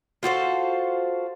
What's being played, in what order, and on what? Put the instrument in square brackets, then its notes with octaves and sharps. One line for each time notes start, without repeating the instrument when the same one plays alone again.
[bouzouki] F4 F#4 A4 C5